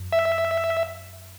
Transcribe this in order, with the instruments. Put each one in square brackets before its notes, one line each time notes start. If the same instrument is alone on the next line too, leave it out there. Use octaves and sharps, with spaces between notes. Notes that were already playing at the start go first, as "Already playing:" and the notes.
Already playing: [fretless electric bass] F#2
[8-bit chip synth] E5